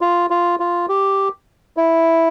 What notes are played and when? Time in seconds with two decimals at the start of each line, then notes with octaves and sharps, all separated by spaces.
0.01 F4
0.30 F4
0.60 F4
0.89 G4
1.77 E4